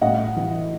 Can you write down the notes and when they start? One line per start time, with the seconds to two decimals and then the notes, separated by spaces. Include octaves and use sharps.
0.01 A2 D#5 F#5
0.36 E3